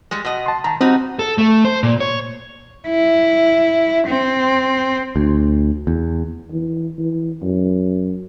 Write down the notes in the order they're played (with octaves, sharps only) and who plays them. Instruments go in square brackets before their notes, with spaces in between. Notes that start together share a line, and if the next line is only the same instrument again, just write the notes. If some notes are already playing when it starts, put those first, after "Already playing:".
[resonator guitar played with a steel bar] G3 G#3
B2 D#5
[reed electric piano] A5 C6
[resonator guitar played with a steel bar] D#3 [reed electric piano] A5 A#5
[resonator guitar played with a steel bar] G3 D#4 F#4 [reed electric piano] C4
[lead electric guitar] A4
A3
C5
A#2
C#5
[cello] E4
C4
[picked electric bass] D2
E2
[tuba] E3
E3
F#2